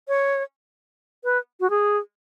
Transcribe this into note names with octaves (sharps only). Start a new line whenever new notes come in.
C#5
B4
F#4
G#4